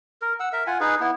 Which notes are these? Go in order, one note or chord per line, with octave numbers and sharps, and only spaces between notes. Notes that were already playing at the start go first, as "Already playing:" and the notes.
A#4
F#5 E6
A#4 E5
F4 F#5 G#5
D#4 G#4 B4
B3 E4